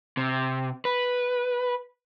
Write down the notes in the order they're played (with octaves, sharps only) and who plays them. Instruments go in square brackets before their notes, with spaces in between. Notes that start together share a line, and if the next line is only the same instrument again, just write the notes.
[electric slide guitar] C3
B4